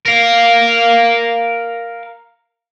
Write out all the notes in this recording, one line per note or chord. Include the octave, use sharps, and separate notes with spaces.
A#4 F5